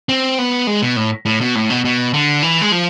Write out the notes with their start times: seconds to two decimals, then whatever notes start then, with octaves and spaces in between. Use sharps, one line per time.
0.09 C4
0.38 B3
0.67 G#3
0.82 B2
0.96 A2
1.26 A2
1.41 B2
1.55 A2
1.70 B2
1.85 B2
2.14 D3
2.42 E3
2.61 G#3
2.72 F3